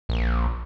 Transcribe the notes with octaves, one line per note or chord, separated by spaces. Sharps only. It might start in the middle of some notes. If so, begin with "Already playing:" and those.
A#1